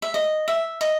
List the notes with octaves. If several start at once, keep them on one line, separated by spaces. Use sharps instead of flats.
E5
D#5
E5
D#5